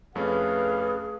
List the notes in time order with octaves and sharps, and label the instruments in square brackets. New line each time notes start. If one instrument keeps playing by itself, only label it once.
[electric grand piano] F2 A3 C#4 [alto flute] G#4 [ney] B4 [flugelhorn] F5